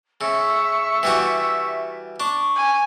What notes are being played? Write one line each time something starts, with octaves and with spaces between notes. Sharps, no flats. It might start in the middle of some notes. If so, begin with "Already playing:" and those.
C#3 E5 C#6 E6
E3 G3 F#4
D4 C#6
G#5